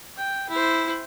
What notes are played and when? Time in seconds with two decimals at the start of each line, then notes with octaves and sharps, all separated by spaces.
0.17 G5
0.50 E4 C5